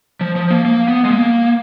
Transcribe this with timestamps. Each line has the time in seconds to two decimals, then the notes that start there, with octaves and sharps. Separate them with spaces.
0.21 F3
0.36 F3
0.51 A#3
0.65 A#3
0.88 B3
1.05 G#3
1.11 A#3